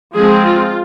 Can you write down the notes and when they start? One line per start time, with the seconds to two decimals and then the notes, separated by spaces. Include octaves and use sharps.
0.16 F3 G#3 C4 G#4
0.47 F4